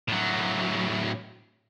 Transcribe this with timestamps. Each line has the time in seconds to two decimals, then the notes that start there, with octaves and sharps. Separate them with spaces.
0.09 A2 F#3